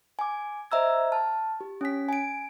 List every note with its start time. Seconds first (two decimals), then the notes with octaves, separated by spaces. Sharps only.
0.19 G#5 D6
0.71 C5 D#5 E5 A#5 E6 G#6
1.12 A5 F6
1.61 G4
1.81 C#4 G#5 B6
2.09 G#5 D7